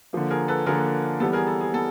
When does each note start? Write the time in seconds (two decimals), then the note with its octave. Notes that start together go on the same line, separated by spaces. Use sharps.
0.13 D3 F3 A#3
0.30 G#4 A#4
0.48 A4 B4
0.66 D3 F3 A#3 G#4 A#4
1.20 E3 G3 B3 A4
1.33 G#4 A#4
1.47 A4
1.61 G#4
1.74 B3 A4